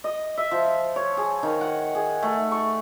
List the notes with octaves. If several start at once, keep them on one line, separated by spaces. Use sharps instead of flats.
D#5
E5
F3
C#5
G#4
D#3
F#5
G#4
A3
C#6